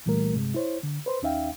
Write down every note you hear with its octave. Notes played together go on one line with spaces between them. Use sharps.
C2 A#2 E3 G3 A3 A#4
G2 C3 G#3
E4 C5 C#5
D3
B4 C5 C6
D#2 C#4 D#4 E5 F5 G5